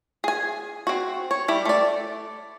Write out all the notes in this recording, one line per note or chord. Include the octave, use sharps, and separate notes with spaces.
G#4 G#5
C4 F#4
C#5
G3 E4
A3 D5